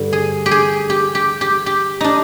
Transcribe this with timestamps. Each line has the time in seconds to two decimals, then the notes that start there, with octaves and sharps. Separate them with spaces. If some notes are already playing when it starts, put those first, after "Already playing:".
Already playing: G2 D3
0.13 G#4
0.46 G4
0.51 G#4
0.90 G4
1.15 G4
1.41 G4
1.66 G4
2.01 D4 D#4